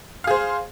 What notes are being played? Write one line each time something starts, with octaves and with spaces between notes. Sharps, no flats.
G#4 C5 F5